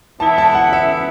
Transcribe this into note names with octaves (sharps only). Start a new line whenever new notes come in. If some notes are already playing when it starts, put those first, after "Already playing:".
E3 B3 E4 A5
A5
F#5
E5